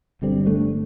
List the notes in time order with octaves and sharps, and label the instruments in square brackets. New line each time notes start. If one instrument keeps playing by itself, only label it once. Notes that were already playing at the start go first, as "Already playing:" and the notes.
[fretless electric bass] G1 G2 D3 G3 C4
A3 D4